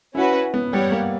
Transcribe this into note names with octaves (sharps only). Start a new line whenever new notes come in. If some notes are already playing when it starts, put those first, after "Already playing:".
C#4 E4 F#4 B4
B3
G3 G4 C#5 F#5
A#3